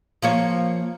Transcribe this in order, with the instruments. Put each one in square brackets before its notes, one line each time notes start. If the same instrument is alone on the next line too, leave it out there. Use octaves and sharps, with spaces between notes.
[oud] F3 A#3 C#5